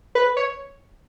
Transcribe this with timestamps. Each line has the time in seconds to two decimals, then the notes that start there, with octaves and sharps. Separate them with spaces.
0.15 B4
0.37 C#5